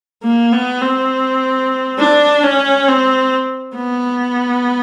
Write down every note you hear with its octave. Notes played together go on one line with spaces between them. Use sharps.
A#3
B3
C4
D4
C#4
C4
B3